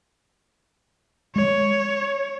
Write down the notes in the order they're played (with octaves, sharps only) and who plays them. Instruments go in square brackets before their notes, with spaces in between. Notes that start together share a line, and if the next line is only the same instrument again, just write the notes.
[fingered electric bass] G#3 [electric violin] C#5